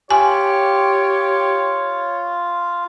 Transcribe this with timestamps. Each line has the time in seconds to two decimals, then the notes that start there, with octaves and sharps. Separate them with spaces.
0.11 F4 G4 C#5 G#5